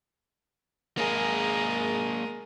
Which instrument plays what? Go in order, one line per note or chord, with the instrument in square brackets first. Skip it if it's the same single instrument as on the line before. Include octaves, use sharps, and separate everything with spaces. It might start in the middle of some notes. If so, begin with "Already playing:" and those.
[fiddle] G#3 A#4 [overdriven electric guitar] A#3 G#4